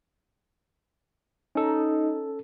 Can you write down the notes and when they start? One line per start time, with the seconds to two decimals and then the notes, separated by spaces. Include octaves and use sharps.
1.55 C#4 D#4 A4